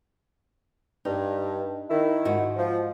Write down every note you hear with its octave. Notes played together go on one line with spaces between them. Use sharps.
G2 D#4
D#3 E4
G#2 F#4
F3